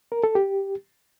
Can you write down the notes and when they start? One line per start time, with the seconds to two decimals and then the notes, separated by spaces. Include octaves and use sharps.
0.12 A#4
0.24 A4
0.35 G4